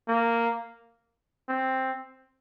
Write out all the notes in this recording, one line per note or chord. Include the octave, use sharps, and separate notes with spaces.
A#3
C4